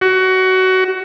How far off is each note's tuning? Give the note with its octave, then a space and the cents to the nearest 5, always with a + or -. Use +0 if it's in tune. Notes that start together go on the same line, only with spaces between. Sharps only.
F#4 +20